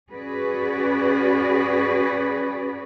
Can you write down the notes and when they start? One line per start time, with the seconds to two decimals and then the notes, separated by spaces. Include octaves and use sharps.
0.11 C#4 F#4 G#4 B4 D5